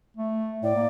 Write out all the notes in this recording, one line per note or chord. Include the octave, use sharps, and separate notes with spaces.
A3
A2 D5
A#3